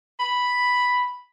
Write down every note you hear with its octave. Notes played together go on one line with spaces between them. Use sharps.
B5